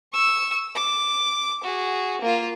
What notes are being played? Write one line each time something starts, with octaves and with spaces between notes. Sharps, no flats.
C#6 E6
D6
F#4 G#4
A#3 F4